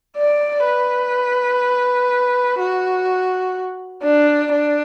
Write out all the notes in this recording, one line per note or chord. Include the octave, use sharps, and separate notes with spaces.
D5
B4
F#4
D4
D4